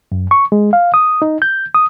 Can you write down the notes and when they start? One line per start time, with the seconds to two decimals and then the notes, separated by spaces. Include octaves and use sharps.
0.12 F#2
0.31 C#6
0.52 G#3
0.73 F5
0.94 D#6
1.22 D#4
1.42 G6
1.74 D#6